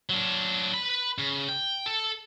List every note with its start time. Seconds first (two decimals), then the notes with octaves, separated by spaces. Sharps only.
0.10 F#3 D4
0.74 B4 B5
1.19 C#3
1.49 G5
1.86 A4